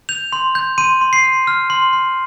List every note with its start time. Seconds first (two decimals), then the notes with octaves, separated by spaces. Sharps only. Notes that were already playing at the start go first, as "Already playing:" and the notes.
0.09 G6 F7
0.33 C6
0.55 G6
0.78 C6 D#7
1.01 C6
1.13 C7
1.24 C6
1.47 F6
1.70 C6
1.93 C6